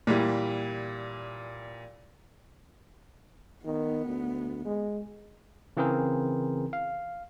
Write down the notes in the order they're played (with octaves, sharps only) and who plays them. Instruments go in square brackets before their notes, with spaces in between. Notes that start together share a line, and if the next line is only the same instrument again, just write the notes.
[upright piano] A#2 E3 G3
[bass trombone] D#3 [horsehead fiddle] B3
[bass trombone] D2
G#3
[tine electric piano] C#3 E3 C4 G#4 A#4 C5
F5